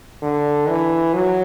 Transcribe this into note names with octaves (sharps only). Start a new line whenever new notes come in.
D3
E3
F#3